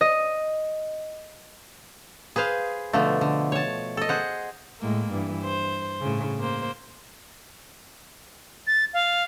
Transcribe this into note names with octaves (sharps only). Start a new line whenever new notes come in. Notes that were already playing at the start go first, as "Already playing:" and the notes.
D#5
G#4 B4 C5 F5
B2 D3 F3 A3
D3
C#5 A5
A4 D#5
G#4 C5 F#5
A2 G#3 A#3
G2 E3
C5
A2 C#3
A#3 C5
A6
F5